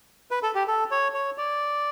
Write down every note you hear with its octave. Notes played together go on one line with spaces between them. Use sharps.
B4
A4
G4
A4
C#5
C#5
D5